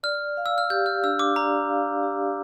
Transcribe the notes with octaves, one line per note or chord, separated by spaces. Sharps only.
D5 F6
F5
E6
F6
G4 G6
F6
D4 E6
D6
D5 A#5
F5
G4